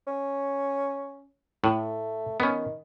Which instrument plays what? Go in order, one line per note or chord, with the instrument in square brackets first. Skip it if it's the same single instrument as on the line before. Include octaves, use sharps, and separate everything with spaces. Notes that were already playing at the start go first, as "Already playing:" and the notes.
[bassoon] C#4
[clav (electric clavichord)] A2 [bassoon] A3
[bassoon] D#3 [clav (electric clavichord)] B3 C#4